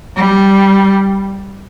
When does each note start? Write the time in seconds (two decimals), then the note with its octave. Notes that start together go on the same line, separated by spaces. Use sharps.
0.17 G3